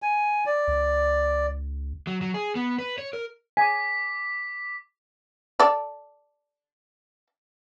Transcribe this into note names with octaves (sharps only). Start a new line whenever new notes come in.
G#5
D5
C#2
F#3
F#3
G#4
B3
B4
C#5
A#4
G#5 D6 B6
A4 D5